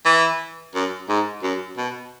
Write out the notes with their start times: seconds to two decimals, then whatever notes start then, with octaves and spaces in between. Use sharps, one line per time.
0.05 E3
0.75 F#2
1.09 G#2
1.43 F#2
1.77 B2